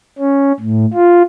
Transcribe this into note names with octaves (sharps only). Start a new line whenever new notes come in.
C#4
A2
F4